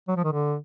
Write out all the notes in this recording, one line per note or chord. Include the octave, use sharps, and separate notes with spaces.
F#3
F3
D#3
D3